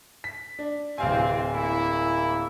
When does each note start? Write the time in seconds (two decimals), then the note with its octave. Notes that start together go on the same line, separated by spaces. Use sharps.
0.24 B6
0.59 D4
0.98 D1 C3 E3 C4 F5 G#5
1.53 A#3 E4